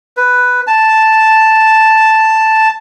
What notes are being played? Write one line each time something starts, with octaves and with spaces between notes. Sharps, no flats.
B4
A5